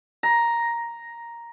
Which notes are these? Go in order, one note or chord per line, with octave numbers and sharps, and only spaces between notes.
A#5